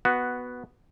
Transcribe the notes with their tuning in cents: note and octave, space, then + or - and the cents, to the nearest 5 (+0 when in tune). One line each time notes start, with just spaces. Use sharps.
B3 +0 F#4 +0